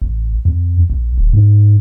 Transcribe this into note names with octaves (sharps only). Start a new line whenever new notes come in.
A1
F2
A#1
D#1
G#2